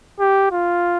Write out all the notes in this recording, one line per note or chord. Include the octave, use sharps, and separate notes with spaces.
G4
F4